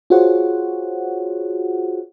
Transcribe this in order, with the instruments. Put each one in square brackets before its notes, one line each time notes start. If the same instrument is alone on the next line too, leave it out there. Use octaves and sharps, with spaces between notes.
[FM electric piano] F4 F#4 G#4 C5 C#5 F#5